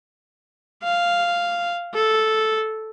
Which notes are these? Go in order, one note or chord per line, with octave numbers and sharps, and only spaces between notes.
F5
A4